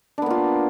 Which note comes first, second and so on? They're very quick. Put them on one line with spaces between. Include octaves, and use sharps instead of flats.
D4 B3 A#3 F4